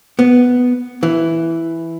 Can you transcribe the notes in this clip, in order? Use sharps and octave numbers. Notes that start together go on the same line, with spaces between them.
B3
E3